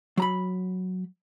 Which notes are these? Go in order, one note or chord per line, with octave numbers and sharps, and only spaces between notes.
F#3 A#5 B5